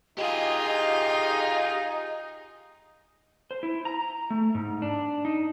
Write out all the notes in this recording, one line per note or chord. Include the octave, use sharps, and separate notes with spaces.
D#4 F4 G4 G#4 D#5 F5
C5
E4
A#5
A3
G#2
D4
D#4